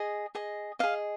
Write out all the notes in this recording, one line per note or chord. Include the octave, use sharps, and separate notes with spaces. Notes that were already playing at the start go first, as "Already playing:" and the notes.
Already playing: G#4 D#5
G#4 D#5
G#4 D#5 F5